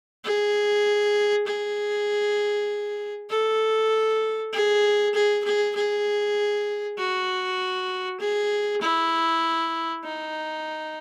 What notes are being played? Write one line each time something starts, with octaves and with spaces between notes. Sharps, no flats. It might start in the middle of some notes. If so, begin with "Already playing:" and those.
G#4
G#4
A4
G#4
G#4
G#4
G#4
F#4
G#4
E4
D#4